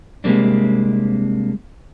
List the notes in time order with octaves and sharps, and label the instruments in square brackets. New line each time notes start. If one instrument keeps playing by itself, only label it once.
[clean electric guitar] C3 G3 G#3 A#3 C4 D4